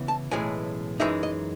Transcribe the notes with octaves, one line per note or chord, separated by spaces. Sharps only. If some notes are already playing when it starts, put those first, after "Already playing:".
Already playing: C#3 E3 B3 E4
A5
B1 A2 E3 G#3 C#4 G#5
F#2 E3 G#3 D#4 E5
D#5